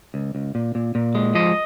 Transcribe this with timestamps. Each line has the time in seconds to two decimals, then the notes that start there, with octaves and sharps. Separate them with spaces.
0.14 C#2
0.35 C#2
0.55 A#2
0.75 A#2
0.95 A#2
1.15 G#3
1.35 F3 D#5